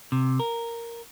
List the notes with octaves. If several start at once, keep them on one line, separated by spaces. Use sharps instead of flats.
C3
A#4